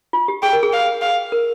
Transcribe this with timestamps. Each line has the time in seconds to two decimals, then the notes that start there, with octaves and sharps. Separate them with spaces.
0.13 F4
0.28 G4
0.42 G#4 G5
0.53 A#4
0.63 G#4
0.73 F5
1.02 F5
1.32 A#4